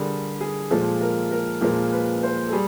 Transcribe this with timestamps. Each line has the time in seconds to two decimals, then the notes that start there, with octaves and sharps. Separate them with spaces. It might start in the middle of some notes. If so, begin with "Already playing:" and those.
Already playing: D3 G3 G#4 A#4
0.41 G#4
0.71 A#2 F3 G#3 A4
1.01 A#4
1.31 A#4
1.61 A#2 F3 G#3 A#4
1.92 B4
2.23 C5
2.48 A4
2.52 G3 G#4